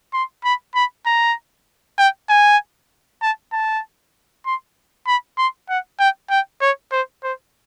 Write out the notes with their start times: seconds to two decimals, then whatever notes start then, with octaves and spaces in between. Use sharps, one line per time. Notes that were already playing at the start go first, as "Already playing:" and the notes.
0.14 C6
0.44 B5
0.75 B5
1.06 A#5
1.99 G5
2.29 G#5
3.22 A5
3.53 A5
4.46 C6
5.07 B5
5.38 C6
5.69 F#5
5.99 G5
6.31 G5
6.61 C#5
6.92 C5
7.23 C5